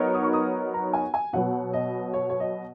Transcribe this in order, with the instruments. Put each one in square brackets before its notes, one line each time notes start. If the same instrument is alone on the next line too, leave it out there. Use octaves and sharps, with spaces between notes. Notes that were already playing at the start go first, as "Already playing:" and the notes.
Already playing: [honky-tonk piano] F#3 B3 D#4 A#4 C#5
[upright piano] D#6
C#6
D#6
A#5
G#5
G#5
[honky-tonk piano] B2 F#3 B3 [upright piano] F#5
[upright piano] D#5
C#5
C#5
D#5